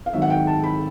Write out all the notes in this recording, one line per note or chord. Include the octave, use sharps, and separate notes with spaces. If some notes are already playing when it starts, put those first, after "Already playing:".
F5
G#1 G#2 D#3 F#3 E5
F#5
G5
A5
B5